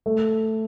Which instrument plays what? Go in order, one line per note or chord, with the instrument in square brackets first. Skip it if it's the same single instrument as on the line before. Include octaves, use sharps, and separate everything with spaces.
[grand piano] A3